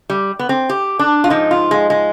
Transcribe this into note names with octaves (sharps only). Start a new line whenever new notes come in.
G3
B3
C4
G4
D4
F4
G#2 F3 D#4
F4
G#3
G#3